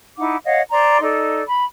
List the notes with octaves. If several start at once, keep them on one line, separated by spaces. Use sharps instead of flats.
D#4 E4 F#5 D6
C#5 D#5 F5 F#5
C5 D5 A#5 C6
D#4 A4 D5
B5